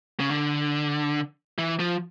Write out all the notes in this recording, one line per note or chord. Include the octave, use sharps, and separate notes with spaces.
C#3
D3
E3
F3